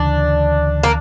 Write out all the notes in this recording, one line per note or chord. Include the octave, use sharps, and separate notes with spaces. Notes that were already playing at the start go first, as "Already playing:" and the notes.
Already playing: D2 C#3 E3 D4
A#3